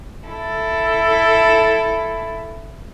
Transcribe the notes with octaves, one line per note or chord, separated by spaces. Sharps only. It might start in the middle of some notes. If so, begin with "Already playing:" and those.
E4 A4